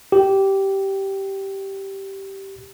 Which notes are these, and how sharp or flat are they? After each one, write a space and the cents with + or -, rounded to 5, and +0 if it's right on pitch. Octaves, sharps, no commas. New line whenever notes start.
G4 -10